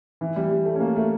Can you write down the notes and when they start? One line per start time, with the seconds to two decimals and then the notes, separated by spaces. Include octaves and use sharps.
0.21 E3
0.36 G3
0.51 G3
0.66 A3
0.76 C#4
0.80 A#3
0.96 A3